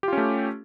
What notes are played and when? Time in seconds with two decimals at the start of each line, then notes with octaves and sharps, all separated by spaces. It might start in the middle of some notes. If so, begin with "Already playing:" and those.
0.03 G4
0.08 F4
0.13 C#4
0.17 A3